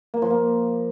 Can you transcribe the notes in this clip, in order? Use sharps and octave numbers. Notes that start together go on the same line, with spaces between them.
A#3
F3
A#3